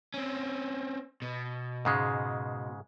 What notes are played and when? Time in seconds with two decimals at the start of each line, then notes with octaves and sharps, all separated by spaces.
0.14 C4 C#4
1.22 B2
1.85 G#2 C#3 G#3